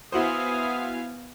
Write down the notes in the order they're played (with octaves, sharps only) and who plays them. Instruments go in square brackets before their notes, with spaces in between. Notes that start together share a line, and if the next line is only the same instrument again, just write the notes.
[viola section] B3 F5 G#5 [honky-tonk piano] E4 F#4 C5 [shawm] D#6